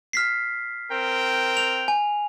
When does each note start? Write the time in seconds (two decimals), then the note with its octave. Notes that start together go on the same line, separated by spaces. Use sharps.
0.13 F6 B6 C7
0.90 C4 A#4 G5
1.57 F7
1.88 G#5